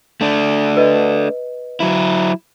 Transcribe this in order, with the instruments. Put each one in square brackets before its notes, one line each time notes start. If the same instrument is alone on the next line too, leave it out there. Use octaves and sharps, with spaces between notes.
[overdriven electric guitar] A3 D4
[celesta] B4 D#5
[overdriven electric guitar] F#3 E4